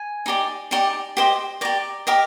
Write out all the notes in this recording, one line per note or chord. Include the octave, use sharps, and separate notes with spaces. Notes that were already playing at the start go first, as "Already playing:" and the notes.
Already playing: G#5
D#4 G4 D5
D#4 G4 D5
G4 C5 D#5
G4 D5 A#5
G4 A#4 D#5